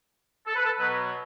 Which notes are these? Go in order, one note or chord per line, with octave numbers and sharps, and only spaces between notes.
A4
B4
A4
B2 F#3 B4